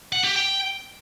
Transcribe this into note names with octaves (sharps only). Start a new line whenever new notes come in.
F#5
G4
G5